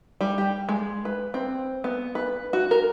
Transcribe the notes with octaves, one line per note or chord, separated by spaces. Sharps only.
G3
G4
G#3
B4
C4
B3
B4
F#4
A#4